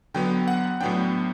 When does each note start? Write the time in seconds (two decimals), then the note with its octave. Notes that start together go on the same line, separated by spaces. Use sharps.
0.14 D3 F#3 B3 G5
0.48 F#5
0.81 A2 F#3 B3 D4 G5